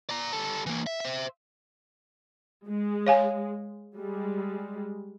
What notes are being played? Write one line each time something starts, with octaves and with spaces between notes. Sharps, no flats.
D5 A#5
G3 A4
E3 A#3
E5
C5 E5
G#3
C#5 F5 G#5
G3 G#3